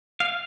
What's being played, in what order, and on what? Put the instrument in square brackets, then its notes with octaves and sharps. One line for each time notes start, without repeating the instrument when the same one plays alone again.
[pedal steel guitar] F5